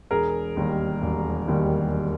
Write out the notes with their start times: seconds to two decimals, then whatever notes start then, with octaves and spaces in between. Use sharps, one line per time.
0.11 E1 G#4 A#4
0.56 D#2 D#3 G3
1.02 E1
1.48 D#2 D#3 G3